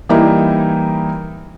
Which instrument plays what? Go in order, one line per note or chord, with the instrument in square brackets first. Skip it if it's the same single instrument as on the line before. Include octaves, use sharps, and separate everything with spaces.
[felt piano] E3 G3 A#3 D#4 E4